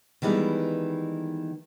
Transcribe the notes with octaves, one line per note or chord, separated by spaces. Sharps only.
D#3 E3 G3 G#3 B3